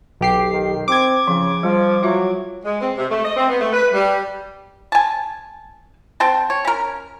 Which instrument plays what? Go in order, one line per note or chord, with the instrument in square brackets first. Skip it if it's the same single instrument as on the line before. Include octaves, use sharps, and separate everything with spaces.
[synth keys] B1 G4 C7
[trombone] D#3
[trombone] C4 [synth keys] D6 G#6
[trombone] C#3 [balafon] F3
[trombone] F3 [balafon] G3
[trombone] F#3 [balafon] F4 E5
[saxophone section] G#3
C4
C3
A3
D#5
C4
B3
A3
B4
G3
[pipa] G#5 A5
C4 G5 A5
C#5
C#4 A#4